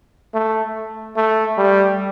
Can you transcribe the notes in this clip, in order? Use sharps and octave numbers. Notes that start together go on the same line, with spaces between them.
A3
A3
G3